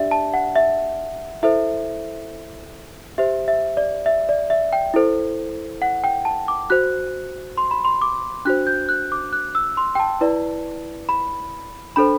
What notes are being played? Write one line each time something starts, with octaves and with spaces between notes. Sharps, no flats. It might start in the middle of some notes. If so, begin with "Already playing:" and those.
Already playing: D4 G4 D5 E5
A5
F#5
E5
E4 A4 C5 E5
G4 C5 E5
E5
D5
E5
D5
E5
G5
E4 A4 C5
F#5
G5
A5
D6
F#4 C5 F#6
C6
B5
C6
D6
D4 F#4 C5 F#6
G6
F#6
D6
F#6
E6
C6
G5
A5
E4 B4 D5
B5
D4 A4 C5 B5